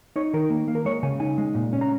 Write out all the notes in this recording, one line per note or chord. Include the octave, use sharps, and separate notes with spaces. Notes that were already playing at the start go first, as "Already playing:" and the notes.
D#4 C#5
D#3 A#4
A#3
A#3
A#4
G#3 C#5
C#3 G#5
D#4 G#5
G#3
A#2
C#4
A#5